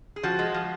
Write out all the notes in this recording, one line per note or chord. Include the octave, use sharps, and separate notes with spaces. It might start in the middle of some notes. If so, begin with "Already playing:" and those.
G#4
F3 F#4
G#3
F3